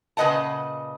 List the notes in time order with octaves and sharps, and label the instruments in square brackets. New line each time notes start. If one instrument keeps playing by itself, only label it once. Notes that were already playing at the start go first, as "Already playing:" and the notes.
[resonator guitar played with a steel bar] A#2 C#3 B4 D#5 F#5 A5